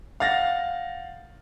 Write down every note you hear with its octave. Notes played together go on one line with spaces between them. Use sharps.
F5 F#5 A6 A#6